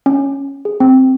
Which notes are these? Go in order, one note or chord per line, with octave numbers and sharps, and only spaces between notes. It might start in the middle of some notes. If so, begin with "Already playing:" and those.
C#4
G#4
C4